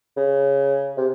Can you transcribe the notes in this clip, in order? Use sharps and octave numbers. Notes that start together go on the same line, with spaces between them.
C#3
C3